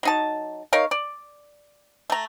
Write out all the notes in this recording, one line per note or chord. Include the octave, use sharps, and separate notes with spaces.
F#3 D#4 A5
D#4 A#4 C#5 F5
D5
A3 A#5